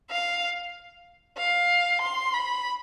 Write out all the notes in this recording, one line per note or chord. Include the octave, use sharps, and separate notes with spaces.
F5
F5
C6
B5